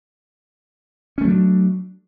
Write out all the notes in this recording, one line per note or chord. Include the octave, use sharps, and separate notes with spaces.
F#3 A3 C#4 D4